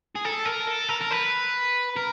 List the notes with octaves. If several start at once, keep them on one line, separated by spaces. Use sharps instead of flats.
G#4
A4
A#4
A4
A#4
A#4
B4
A#4